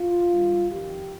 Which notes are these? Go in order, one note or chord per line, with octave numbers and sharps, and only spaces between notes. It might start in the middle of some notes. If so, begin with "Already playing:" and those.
Already playing: F4
G2 D#3
F2 D#3 G4